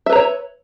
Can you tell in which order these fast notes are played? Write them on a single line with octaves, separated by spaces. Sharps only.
E5 B4 A#5 C#5